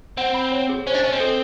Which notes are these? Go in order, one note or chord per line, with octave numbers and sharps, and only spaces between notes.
C4 F#5
B5
C#5
G#4
C#4 C5
D4
C#4 D#5
C4
A4